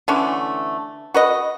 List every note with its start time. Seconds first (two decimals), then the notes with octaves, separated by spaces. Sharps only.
0.08 D3 E3 A3 C#4
1.14 F#4 B4 D#5